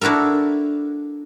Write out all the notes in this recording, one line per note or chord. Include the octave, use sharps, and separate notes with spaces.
D4 E4 F#4 A4 A#4